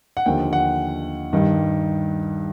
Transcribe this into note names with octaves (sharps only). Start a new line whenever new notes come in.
F#5
D#2 D3 F3 G5
F#5
G2 D#3 G3